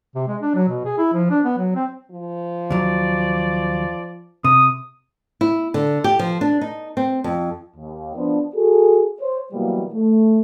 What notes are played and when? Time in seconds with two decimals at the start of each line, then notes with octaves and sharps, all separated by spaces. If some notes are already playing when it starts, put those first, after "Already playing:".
0.15 C3
0.27 G#3
0.41 D4
0.55 F#3
0.69 B2
0.85 G#4
0.98 E4
1.13 F3
1.30 D4
1.44 B3
1.58 F#3
1.75 C4
2.11 F3
2.70 D#2 F#3 D5
4.44 C3 D#6
5.41 E4
5.74 D3
6.04 G4
6.19 F3
6.41 D4
6.61 D#4
6.97 C4
7.24 F2
7.76 D#2
8.15 F3 B3 D4
8.55 F#4 G#4 A4
9.20 C5 C#5
9.53 B2 E3 F#3 G3 A#3
9.93 A3